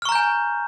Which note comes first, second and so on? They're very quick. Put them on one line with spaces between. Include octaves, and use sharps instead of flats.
F6 C#6 A#5 G6 G#5